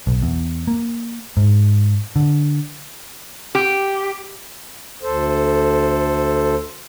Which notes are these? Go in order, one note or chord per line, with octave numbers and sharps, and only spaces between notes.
B1
E2
A#3
G#2
D3
G4
D2 A4 C5